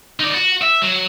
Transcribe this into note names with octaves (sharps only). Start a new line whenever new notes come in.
D#4 D5
F#4
E5
F#3